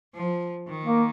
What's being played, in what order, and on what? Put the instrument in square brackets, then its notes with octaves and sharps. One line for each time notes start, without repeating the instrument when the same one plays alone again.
[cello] F3
D#3
[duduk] A#3